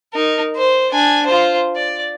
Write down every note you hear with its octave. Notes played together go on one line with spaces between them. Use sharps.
D#4 A#4
C5
D4 G#5
F4 C5
D5